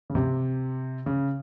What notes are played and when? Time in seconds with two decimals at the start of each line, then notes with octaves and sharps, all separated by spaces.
0.10 C#3
0.15 C3
1.06 C#3